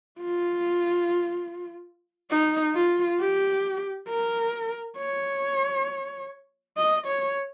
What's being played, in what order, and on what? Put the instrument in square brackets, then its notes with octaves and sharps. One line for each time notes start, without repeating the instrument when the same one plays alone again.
[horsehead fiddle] F4
D#4
F4
G4
A#4
C#5
D#5
C#5